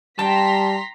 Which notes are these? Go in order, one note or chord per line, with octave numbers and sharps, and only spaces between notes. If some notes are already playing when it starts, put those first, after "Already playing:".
G3 G5 A5 A#5 C6 B6